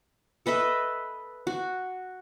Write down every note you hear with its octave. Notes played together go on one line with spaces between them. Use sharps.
A4 B4 D#5 E5
F#4